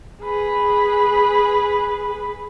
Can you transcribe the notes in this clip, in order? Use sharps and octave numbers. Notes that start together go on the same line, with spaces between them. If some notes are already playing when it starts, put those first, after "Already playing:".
G#4 B4